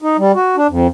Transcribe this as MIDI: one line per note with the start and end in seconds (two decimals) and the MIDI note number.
0.02 0.17 63
0.18 0.32 55
0.35 0.56 66
0.56 0.67 62
0.70 0.87 41